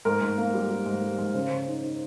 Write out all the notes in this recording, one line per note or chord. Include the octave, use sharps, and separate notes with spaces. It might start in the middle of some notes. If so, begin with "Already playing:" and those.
G#2 A#4
G#2
A#3
G3
G3
G#2
G3
G#2
C#3 C5
C#3
D#4
D#4